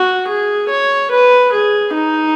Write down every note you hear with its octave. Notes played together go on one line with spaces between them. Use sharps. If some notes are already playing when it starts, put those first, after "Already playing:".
Already playing: F#4
G#4
C#5
B4
G#4
D#4